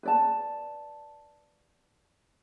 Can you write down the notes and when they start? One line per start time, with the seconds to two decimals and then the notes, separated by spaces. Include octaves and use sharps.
0.03 B4 D5 A5